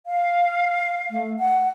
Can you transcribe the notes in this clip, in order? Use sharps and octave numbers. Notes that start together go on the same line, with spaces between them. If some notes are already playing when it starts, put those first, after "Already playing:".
F5
A3
F#5